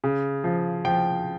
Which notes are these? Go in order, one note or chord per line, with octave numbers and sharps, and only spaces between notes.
C#3
F3
F3 G5